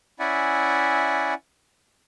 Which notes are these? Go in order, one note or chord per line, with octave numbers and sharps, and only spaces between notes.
C#4 E4 D5 E5 F#5 G#5